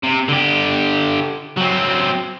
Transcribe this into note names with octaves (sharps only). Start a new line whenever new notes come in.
C3
D3 G4
F#3 C4